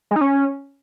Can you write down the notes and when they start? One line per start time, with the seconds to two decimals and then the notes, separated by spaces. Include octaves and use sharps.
0.11 G#3
0.16 D#4
0.21 C#4